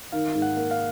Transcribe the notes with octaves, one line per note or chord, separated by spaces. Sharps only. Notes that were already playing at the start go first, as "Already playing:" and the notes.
D#3 F5
G#2
F#5
A#3
F5